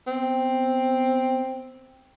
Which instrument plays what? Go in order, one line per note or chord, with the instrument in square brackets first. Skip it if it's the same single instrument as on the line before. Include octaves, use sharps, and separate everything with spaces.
[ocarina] B3 [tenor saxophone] C4